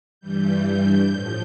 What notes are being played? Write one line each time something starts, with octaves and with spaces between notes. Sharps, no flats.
G2 E3 G3 G6
G6
A2 F3